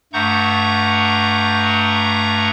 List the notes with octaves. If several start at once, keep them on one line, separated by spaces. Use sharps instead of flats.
G2 A3 F#5 A#5 C#6 G6